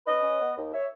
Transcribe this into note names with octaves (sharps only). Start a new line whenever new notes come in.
C#4 B4 D#5
C#4
B3
D#2
C#5 E5